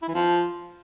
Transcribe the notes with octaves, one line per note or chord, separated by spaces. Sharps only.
E4
E3
F3